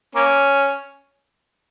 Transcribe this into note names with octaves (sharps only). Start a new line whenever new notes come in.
A#3 C#4